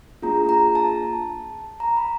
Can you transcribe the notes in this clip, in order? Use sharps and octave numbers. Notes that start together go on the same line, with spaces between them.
A#3 D4 F4 G#4 A#5
A#5
A5
A#5
B5